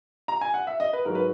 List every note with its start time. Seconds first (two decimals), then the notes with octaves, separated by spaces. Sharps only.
0.28 A#5
0.41 G#5
0.54 F#5
0.67 E5
0.80 D#5
0.93 B4
1.05 G#2 F#3 A#4
1.15 B4